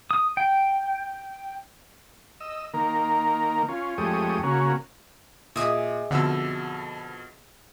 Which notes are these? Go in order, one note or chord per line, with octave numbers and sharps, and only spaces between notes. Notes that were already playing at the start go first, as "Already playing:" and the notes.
D#6
G5
D#5 E6
D#3 A#3 A#4
C#4 F4
F2 G#3 A3 G4 C#5 D#6
C#3 A#3 C#4 F#4
A#2 G#4 D#5 E5 D#6
F2 B2 D3 E6